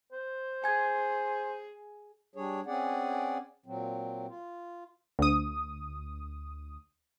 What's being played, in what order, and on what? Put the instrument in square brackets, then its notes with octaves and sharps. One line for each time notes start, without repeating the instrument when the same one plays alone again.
[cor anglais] C5
[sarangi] G#4 [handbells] G#5 G#6
[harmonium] G3 D4 G#4 C#5
C4 C#4 G#4 D5 F#5
A#2 F#3 C4
F4
[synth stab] D2 D#6